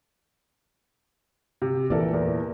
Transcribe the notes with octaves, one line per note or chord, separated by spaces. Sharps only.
C3
A#2 E3 A4 A#4 D5
E2 A#4